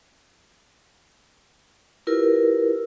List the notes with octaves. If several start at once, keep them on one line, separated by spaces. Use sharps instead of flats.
E4 F4 G4 A#4 B4